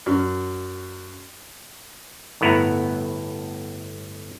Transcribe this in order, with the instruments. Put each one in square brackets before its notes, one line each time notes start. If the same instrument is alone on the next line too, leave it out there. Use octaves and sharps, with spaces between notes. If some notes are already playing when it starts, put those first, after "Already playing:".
[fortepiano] F#2
[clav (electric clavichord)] G1 A2 B3 E4 F#5 A#5